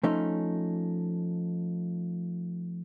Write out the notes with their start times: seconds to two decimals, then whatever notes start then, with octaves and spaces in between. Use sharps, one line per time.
0.03 F3 A3 C#4 D#4